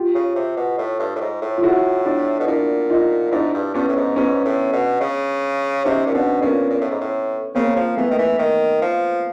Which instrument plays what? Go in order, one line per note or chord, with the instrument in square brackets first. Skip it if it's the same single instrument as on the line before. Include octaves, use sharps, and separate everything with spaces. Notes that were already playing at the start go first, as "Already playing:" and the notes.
Already playing: [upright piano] F4 G4
[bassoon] C#3
C3
B2
A2
G2
A2
G#2
A2
[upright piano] F4
[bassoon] A2 [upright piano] E4 F#4
[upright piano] D4 E4
[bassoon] B2
[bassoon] A#2 [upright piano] D4 E4
[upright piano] D#4 F4
[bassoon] G#2 [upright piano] D4 E4
[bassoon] G2
[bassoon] G2 [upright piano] B3 C#4
[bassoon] A2
G#2
[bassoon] G#2 [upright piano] B3 C#4
[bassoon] A2
B2
C#3
[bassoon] C3 [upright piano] C#4 D#4
[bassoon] A#2
[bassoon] B2 [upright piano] C4 D4
[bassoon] A#2 [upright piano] B3 C#4
[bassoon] A#2
A2
G#2
A2
[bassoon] C#3 [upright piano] A#3 C4
[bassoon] F3
[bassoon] E3 [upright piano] A3 B3
[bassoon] D#3
E3
D#3
F3